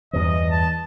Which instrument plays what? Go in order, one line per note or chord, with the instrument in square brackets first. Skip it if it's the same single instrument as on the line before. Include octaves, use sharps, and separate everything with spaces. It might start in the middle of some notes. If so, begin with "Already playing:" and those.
[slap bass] E2 G2 E3 [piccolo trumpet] D#5
[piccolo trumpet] A5